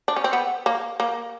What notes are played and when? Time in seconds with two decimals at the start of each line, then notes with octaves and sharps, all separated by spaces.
0.08 D4
0.16 C#4
0.24 C4
0.33 B3
0.66 A#3
1.00 A#3